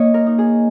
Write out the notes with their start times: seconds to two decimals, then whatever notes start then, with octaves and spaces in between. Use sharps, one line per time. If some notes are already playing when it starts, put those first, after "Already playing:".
Already playing: A#3 C#5 D#5
0.14 A#4
0.27 D#4
0.38 G#4